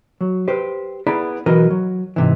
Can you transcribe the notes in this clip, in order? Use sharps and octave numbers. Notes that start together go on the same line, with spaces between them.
F#3
G4 B4 C5
B3 E4 G#4 D5 A#5 B5
B1 E3 F#4 A#4 B4 D#5
F#3
G#2 C3 E3